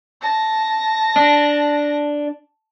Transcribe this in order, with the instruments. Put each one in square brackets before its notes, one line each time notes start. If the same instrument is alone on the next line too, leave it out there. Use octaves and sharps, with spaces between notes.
[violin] A5 A#6
[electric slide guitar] D4